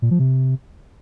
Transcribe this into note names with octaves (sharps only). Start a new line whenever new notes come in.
A#2
F3
C3